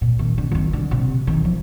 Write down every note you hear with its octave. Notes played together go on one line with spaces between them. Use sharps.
A#2
D#3
D3
F3
D#3
D3
C3
D#3
F3